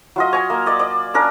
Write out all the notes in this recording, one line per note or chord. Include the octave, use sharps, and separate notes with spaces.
F#3 F4 D#5
C#5 G#5
A#3
D5 D#5
D5
C#4 D4 A#4